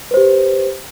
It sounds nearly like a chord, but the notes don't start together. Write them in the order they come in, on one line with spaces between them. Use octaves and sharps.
B4 C5 G4